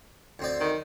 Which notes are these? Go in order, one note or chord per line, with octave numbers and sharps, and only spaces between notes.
D2 C4 D5
D#3